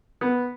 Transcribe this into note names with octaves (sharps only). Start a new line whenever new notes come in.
B3